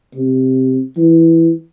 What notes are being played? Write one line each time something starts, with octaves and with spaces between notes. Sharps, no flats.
C3
E3